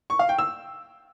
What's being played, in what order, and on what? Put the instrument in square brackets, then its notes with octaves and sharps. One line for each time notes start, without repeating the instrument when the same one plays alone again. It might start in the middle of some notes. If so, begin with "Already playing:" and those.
[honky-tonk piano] C#6
F5
G5
E6